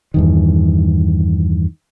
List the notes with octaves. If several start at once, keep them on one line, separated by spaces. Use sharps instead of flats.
E2 G2 D#3